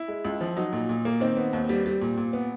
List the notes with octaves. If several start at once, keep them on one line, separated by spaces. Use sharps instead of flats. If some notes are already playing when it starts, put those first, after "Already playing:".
Already playing: E4
G#3
C#2
F3
F#3 D#4
A#2
A#2
A#3
D#3 C4
B3
D#2
G3
G3
A#2
A#2
B3